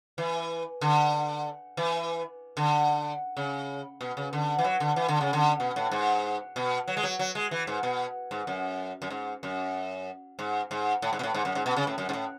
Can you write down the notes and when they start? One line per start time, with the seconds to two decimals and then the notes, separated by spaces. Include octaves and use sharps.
0.18 E3
0.81 D3
1.77 E3
2.57 D3
3.37 C#3
4.01 B2
4.17 C#3
4.33 D3
4.59 E3
4.64 F#3
4.80 D3
4.96 E3
5.08 D3
5.21 C#3
5.33 D3
5.60 B2
5.76 A2
5.92 G#2
6.56 B2
6.88 F#3
6.97 G#3
7.03 F#3
7.19 F#3
7.35 G#3
7.51 E3
7.67 G#2
7.83 B2
8.31 G#2
8.47 F#2
9.02 F#2
9.10 G#2
9.43 F#2
10.39 G#2
10.71 G#2
11.02 A2
11.13 G#2
11.19 B2
11.23 A2
11.34 G#2
11.45 F#2
11.55 G#2
11.66 B2
11.77 C#3
11.87 A2
11.98 F#2
12.09 G#2
12.13 A2